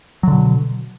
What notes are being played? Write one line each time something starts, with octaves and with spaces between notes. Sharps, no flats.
B2 D3 F#3